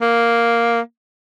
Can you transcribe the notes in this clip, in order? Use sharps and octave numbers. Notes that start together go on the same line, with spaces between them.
A#3